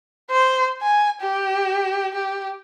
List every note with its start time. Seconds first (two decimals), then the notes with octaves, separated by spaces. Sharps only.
0.30 C5
0.82 G#5
1.21 G4
2.15 G4